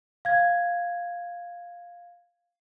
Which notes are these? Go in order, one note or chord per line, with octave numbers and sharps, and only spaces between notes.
F5 G#6